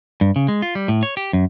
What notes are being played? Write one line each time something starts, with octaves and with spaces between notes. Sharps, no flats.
G2
C#3
G#3
F4
G3
A2
C#5
G4
F#2